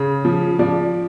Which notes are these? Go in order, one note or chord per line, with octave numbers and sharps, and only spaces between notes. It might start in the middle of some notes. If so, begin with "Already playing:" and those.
Already playing: C#3
F3
F3 D5